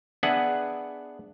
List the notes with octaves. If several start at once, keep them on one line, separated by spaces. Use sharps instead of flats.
B3 D4 G#4 B4 E5 F#5